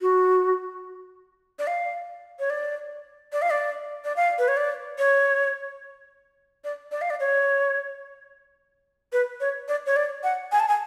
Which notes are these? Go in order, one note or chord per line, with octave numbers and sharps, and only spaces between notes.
F#4
D5
F5
C#5
D5
D5
F5
D5
D5
F5
B4
C#5
D5
C#5
D5
D5
F5
D5
C#5
B4
C#5
D5
C#5
D5
F#5
G#5
A5
G#5